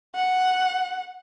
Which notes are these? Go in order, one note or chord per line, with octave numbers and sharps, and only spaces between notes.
F#5